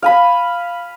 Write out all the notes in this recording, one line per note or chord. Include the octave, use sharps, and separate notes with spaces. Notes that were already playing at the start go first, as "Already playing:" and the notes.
F5 G#5 B5